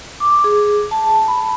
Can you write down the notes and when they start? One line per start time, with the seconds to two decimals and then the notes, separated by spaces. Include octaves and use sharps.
0.20 D6
0.44 G#4
0.91 A5
1.28 B5